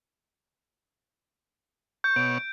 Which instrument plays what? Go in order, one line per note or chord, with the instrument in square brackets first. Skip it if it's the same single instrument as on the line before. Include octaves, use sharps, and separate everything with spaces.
[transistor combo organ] C#6 [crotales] G6
[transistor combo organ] B2 C#5 [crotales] D7